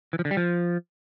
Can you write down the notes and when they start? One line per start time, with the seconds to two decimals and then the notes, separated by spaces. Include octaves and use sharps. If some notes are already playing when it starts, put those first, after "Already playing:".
0.13 E3
0.19 F3
0.25 D3
0.31 G3
0.37 F3